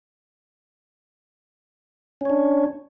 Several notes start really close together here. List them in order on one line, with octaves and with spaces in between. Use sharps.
C#4 C#5 D4